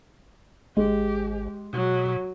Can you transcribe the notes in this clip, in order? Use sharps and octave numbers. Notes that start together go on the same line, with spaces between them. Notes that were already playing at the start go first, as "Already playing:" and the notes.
G#1 G#3 G4
B2 F#3